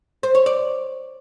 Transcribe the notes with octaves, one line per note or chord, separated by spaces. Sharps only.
C5
C#5
D5